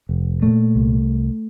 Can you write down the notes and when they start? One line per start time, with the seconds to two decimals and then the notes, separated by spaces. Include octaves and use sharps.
0.09 F1
0.42 A#2 A3
0.75 C2